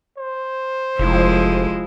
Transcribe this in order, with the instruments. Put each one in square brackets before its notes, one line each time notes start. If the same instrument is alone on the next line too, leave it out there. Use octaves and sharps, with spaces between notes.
[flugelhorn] C5
[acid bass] F1 [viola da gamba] F3 G#3 E4